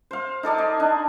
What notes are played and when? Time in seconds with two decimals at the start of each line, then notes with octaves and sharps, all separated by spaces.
0.11 C5 F5
0.43 D#4 A4 D5 G#5
0.58 D#5
0.80 D4